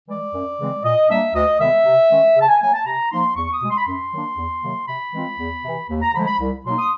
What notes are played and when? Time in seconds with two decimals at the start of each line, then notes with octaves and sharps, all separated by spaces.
0.08 E3 G#3 D5
0.34 F#2
0.59 C#3 E3 G#3 C4
0.84 A#2 D#5
1.09 G3 A#3 D4 E5
1.34 D2 D#5
1.59 C3 D#3 G#3 B3 E5
1.85 C3
2.11 D#3 G#3 C#4
2.36 C#3 A5
2.48 G#5
2.61 F#3 A#3 G#5
2.73 A5
2.86 C3 A#5
3.11 F3 A#3 D#4 C6
3.36 E2 C#6
3.53 D#6
3.62 B2 G#3
3.70 C6
3.77 B5
3.85 F#2 C6
4.13 D#3 F#3 A#3 D4
4.37 E2
4.63 C3 D#3 F#3 A#3
4.88 C3 B5
5.13 E3 G#3 C4 F4
5.39 E2
5.64 C3 E3
5.89 D#2
6.02 A#5
6.14 D3 F3 G#3 B5
6.27 B5
6.40 C2
6.64 B2 F#3 A#3 D#4 C6
6.79 D#6